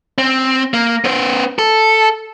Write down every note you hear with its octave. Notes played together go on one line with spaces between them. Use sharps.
C4
A#3
B3 C5
A4